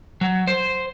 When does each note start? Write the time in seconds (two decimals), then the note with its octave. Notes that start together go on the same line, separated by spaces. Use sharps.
0.21 F#3
0.47 C5